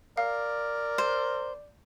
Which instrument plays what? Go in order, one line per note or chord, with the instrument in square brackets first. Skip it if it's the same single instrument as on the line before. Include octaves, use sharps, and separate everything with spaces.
[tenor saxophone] A#4 [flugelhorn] D5 [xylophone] F5
[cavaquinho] C5